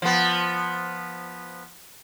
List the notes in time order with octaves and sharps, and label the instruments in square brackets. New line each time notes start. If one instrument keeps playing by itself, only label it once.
[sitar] F3 B3